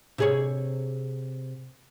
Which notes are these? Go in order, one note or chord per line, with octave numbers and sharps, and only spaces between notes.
C3 G#4 C#5